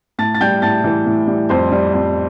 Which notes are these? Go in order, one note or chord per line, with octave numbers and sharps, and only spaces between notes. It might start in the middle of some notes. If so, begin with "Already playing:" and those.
A2 A5 A6
A6
G3 G5 G6
A2 A5 A6
E3
A2
G3
F2 C5 C6
G3
F2